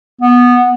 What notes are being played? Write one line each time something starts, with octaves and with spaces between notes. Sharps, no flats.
B3